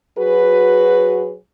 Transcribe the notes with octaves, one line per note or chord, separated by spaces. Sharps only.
F#3 F#4 G#4 B4